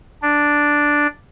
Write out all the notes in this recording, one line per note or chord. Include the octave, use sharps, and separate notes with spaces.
D4